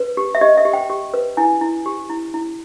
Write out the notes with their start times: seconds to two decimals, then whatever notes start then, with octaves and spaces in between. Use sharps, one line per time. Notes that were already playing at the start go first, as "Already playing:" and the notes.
Already playing: B4
0.17 G4
0.35 E5
0.41 G4 D#5
0.57 E5
0.65 G4
0.73 G5
0.90 G4
1.14 B4
1.37 E4 G#5
1.61 E4
1.86 G4
2.10 E4
2.34 E4